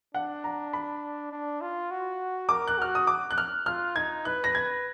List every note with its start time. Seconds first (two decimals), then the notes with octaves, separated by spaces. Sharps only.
0.14 D4 F#5
0.44 A#5
0.73 B5
1.32 D4
1.61 F4
1.91 F#4
2.49 A#4 D6
2.68 F#6
2.78 F#4 F6
2.95 D#6
3.07 D6
3.31 F#6
3.38 F6
3.66 F4 F6
3.96 D#4 G#6
4.25 B4 F#6
4.44 A#6
4.55 G#6